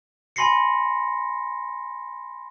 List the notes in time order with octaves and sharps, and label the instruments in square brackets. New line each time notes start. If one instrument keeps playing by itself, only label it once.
[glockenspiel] G#5 B5 C6 A#6 C7 C#7